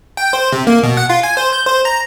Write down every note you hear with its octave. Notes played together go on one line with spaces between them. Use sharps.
G5
C5
C3
A#3
B2
F#5
F4
G#5
C5
G6
C5
A#5